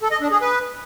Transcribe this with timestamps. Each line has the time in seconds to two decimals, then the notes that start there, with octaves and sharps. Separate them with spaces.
0.01 A4
0.11 D#5
0.21 D4
0.31 G#4
0.41 B4